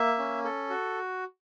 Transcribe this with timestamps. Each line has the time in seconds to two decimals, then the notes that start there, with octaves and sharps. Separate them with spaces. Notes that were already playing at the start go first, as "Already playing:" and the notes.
Already playing: A#3 E5
0.18 C#4
0.44 A4
0.70 F#4